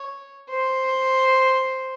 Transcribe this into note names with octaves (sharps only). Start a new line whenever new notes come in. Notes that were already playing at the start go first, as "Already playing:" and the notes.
Already playing: C#5
C5